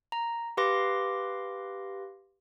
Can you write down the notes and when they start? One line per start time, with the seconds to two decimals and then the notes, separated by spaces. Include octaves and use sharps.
0.12 A#5
0.57 G4 B4 F5 C6 D6 A#6